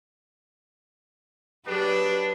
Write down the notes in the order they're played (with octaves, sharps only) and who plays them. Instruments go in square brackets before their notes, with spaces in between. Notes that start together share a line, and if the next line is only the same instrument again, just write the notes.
[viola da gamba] F#3 G4 G#4 [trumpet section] D4 [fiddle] B4